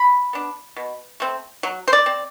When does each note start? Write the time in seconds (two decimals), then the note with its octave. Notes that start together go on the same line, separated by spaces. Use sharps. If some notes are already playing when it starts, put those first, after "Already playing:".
Already playing: B5
0.33 B3 D4
0.77 B2
1.20 A3 C4
1.63 F#3
1.88 C5
1.93 D5
2.06 C4